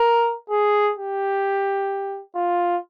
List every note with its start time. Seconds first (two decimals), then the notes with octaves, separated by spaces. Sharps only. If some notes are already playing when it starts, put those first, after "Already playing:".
Already playing: A#4
0.50 G#4
0.97 G4
2.35 F4